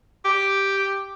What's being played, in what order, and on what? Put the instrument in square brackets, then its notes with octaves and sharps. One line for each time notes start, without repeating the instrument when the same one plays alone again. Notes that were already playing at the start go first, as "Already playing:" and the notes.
[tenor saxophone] G4